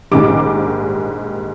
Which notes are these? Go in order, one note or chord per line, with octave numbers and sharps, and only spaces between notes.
A#1 G#2 D#3 G3 D6